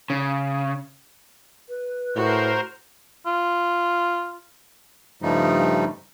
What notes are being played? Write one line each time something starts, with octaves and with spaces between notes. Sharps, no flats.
C#3
B4
A2 F#4 A#4 C5
F4
G2 C#3 F3 G3 A3 D#4